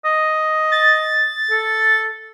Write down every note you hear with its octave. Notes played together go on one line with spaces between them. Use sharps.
D#5
A6
A4